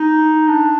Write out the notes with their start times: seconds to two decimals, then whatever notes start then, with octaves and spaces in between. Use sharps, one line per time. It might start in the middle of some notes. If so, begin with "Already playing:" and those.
Already playing: D#4
0.48 D4